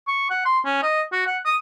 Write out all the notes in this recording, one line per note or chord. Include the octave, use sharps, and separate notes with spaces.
C#6
F#5
C6
C#4
D#5
F#4
F#5
D#6